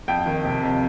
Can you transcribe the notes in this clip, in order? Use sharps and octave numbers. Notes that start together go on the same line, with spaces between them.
F2 G5
D#3
C3
F2